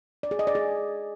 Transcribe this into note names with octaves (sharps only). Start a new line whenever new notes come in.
D5
G#4
D#5
D5
G#4